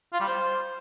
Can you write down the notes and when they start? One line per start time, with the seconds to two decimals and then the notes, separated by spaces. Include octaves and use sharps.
0.13 F4
0.20 G3
0.27 C5